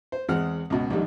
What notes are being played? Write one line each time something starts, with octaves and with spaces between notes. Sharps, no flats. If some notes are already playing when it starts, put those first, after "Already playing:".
C5
E2 G#3 C4 F#5 F6
C#2 B2
A#1 G#2 D#3 G3